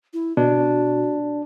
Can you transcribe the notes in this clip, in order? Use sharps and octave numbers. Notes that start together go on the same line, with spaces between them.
E4
B2 D4 F#4